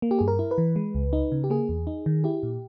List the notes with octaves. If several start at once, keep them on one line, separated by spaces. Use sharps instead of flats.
A#3
G4
G2 G#4
A#4
E4
B4
E3
G#3
C#2
D#4
C#3
G4
A#3 G#4
E2
D#4
D#3
E4 G4
A#2